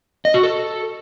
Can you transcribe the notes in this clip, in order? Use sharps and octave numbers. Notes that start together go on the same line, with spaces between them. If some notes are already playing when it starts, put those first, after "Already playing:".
D#5
F#4
A4